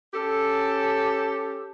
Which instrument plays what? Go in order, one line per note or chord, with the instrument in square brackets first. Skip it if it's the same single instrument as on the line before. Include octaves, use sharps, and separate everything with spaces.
[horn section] C#4 G4 A4